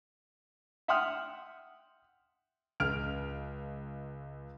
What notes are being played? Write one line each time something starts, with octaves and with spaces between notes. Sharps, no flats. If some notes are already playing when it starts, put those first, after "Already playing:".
E5 F#5 G5 C6 D#6 F6
C#2 F6 D7 F7